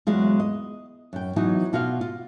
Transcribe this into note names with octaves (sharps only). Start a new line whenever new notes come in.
E2 F#3 G#3 F4
D#5
F#2 G5
E3 F#3 B3 D#4
B2 F4 F#4 D5 F5
F4